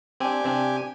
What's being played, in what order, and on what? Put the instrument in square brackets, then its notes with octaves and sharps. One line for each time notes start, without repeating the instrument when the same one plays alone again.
[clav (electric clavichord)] C4 D4 [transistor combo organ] G4 G#5
[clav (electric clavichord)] C3 C4 D4